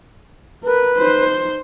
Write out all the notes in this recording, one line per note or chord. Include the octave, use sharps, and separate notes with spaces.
A#4 B4
D#4 C5